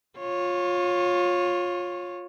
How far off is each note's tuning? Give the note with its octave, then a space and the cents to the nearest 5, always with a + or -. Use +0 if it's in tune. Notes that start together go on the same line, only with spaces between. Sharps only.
F4 +20 C#5 -15